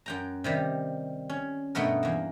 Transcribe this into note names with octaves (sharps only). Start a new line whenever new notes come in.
F#2 G5 A#5
C3 D#3 G3
C#4
G2 B2 A3 B3 A#4
E2 A#3